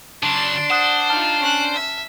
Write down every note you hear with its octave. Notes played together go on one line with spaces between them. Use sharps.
C#3 F#3 D4 C6
C5 F#5 D#6 F#6
D#4 F4 A5 F6
C#4 F#6
E5